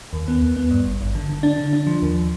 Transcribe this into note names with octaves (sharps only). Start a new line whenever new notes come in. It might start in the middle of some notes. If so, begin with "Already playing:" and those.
D#2
B3
D#2
B3
G2
G#1
G#1
D3
D3
D4
D3
D4
F3
D#2